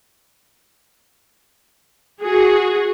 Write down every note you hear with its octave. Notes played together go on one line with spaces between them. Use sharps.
F#4 G#4